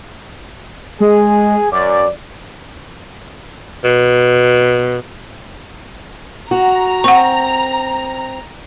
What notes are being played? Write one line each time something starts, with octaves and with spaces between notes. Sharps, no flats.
G#3 G#4
F#2 D5
B2
F#4 A#5
C4 F#5 C#6